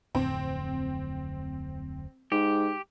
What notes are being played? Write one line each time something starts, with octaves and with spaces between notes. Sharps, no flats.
D1 F2 C4
G#2 G4